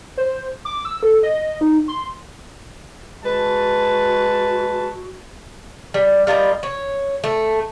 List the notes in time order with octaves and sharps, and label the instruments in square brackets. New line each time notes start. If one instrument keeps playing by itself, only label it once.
[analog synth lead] C5
D6
E6
A4
D#5
D#4
C6
[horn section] G#3 B4 A5 [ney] F#4
[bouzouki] G3
G3 F4 A#4 D#5
C#5
A3